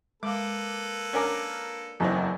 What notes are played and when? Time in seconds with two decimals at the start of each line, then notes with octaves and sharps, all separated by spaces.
0.23 G#3 A#3 A4 B4 F5 D6
1.13 C#4 D4 A#4 F#5 G#5 D6
2.00 F#1 E2 C4 D#4 A4